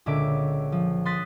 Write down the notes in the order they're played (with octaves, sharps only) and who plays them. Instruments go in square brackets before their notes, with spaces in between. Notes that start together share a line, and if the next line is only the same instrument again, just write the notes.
[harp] C#2 A#2 D3 E5 D6
F3
C6 D#6 F#6 A6 B6